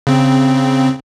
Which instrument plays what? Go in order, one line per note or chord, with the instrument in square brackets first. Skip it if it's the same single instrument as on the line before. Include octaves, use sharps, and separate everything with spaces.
[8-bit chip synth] C#3 C4